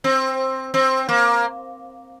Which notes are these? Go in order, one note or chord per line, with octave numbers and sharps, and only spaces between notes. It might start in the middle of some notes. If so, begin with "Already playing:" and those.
C4
C4
A#3